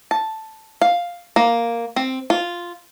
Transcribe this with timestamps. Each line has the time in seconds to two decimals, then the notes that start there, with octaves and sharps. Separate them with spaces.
0.11 A5
0.82 F5
1.36 A#3
1.96 C4
2.30 F4